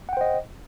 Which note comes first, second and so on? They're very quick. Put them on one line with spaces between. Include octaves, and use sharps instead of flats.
F#5 G5 C5 D#5